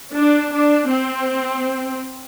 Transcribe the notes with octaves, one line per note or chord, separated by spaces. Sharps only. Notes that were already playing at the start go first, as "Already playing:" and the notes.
D4
D4
C4